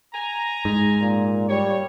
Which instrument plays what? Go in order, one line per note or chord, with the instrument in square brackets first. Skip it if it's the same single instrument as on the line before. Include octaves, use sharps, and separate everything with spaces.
[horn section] G#5 A#5
[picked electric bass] G#2
[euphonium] A#2
[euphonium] G3 [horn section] C#5